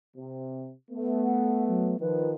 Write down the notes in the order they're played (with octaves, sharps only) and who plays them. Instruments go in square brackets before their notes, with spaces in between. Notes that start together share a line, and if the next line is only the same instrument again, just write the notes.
[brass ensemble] C3
A3 B3
[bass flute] F#5
F#3
[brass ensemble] D#3 F3 [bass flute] B4